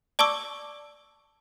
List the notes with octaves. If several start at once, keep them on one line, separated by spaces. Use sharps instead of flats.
D5 A5 C#6 D6 E6